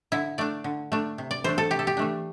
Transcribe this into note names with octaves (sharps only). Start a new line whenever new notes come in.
D3 E4
A3 D4 D5
D3
A3 D4
C3
D5
E3 A3 D4 C5
A4
C3 G4
A4
G4
E3 A3 D4